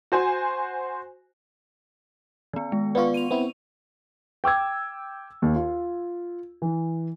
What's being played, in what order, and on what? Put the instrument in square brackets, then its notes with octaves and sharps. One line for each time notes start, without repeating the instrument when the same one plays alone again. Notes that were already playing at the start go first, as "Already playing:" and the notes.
[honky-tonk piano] F#4 C5 G#5
[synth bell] D#3 B3
G#3
[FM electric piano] B3 F4 [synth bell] D5 C#6
[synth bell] D#7 F7
[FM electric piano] B3 C4 E4
[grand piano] G5 D6 E6 G#6
D#2
F4
E3